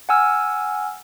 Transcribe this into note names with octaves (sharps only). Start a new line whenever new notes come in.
F#5 G#5 E6 F6